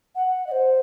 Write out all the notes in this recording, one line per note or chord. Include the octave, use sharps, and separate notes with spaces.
F#5
D#5
C5